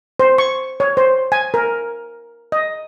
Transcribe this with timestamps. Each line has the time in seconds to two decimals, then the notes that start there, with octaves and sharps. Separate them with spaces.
0.19 C5
0.38 C#6
0.80 C#5
0.97 C5
1.32 G#5
1.54 A#4
2.52 D#5